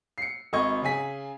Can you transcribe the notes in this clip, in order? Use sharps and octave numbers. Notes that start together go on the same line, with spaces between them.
C7 C#7
G#1 D#5 C#6 G#6
C#3 G#4 G#5 B6